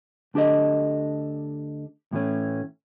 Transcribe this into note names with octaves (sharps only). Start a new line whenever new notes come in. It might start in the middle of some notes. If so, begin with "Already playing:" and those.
D2 D4 G4 A4 D#5
A2 E3 A3 C#4